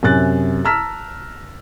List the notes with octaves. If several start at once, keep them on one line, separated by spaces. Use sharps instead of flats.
F#2 C3 G#5 F#6 A6
A5 A#5 E6 F6 B6